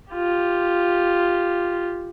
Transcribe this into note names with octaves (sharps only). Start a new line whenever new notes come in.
F4 G4